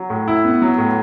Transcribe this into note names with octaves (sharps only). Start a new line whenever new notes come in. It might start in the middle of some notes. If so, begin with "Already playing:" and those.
Already playing: F#3
A2
E4
B3
F#3
A2